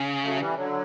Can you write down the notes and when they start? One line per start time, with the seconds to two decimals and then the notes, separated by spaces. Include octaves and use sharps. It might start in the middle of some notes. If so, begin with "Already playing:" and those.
Already playing: C#3
0.24 F#3 A3
0.40 E3 G3
0.57 D3 F#3